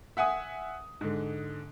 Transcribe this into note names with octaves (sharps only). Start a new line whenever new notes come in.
E5 F#5 G#5 D#6
G#2 D3